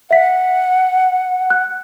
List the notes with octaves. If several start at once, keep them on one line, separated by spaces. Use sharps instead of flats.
E5 F#5 B6
F#6